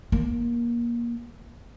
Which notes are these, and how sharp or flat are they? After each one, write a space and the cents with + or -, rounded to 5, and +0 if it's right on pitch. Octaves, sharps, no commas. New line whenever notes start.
A#3 +25